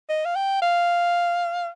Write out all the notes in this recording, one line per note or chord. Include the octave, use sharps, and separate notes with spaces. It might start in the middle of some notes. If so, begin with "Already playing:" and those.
D#5
F5
G5
F5